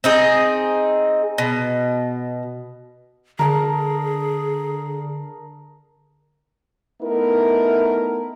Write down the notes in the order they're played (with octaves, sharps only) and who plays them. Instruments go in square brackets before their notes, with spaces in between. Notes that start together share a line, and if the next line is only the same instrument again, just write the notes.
[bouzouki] C4 D#4 G#4
B2
[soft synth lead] D3 [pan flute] G#4 [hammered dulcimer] A#4 A5
[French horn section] A3 B3 D#4 E4 A#4